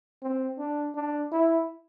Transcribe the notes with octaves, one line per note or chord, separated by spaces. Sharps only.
C4
D4
D4
E4